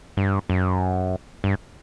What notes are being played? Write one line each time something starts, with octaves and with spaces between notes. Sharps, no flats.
G2
F#2
G2